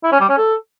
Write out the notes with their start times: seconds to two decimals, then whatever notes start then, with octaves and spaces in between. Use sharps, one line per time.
0.03 E4
0.12 C#4
0.20 G3
0.29 C#4
0.38 A4